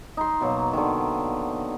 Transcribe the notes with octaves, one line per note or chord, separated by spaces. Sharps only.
D#4 C6
B2 F#3 A#3
D3 D#3